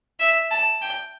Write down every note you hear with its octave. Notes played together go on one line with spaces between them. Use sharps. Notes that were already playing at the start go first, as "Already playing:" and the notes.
E5
A5
G5